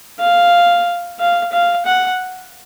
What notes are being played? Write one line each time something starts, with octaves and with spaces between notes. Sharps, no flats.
F5
F5
F5
F#5